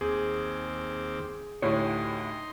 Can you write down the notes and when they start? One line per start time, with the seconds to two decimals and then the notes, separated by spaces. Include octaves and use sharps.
0.01 D#2 C4 G#4 D6
1.62 D2 A2 D#4 G4 C#5 C6